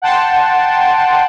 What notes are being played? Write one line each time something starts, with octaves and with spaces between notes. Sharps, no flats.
F#5 G5 A5 C6